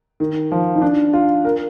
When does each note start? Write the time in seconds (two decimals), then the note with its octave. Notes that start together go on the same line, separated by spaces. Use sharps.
0.20 D#3
0.52 F3
0.76 D#4
0.82 D4
1.13 F4
1.45 A#4